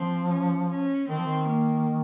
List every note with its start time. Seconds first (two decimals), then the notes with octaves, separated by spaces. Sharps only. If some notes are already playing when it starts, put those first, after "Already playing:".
Already playing: F3 C4
0.31 C#4
0.70 C#4
1.09 D#3 C4
1.18 F3
1.25 D#3
1.48 A#3